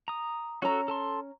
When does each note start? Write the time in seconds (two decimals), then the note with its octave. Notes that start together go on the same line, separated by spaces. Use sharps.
0.08 A#5 D#6
0.62 C#4 F#4 A4 A#5 E6
0.88 A4 A5 C6